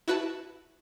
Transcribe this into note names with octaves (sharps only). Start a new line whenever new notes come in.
E4 F#4 B4 E5 A5